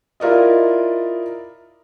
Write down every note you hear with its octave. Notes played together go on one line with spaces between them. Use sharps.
E4 F4 A#4 D5 D#5